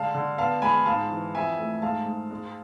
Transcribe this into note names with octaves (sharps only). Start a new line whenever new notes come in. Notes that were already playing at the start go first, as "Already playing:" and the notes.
Already playing: D3 G#3 F5 A5
D3
B3 F5 A5
G#3 G#5 B5
G#2 F5 A5
E3
F2 E5 G#5
A3
G#2 F5 A5
G#2
G#3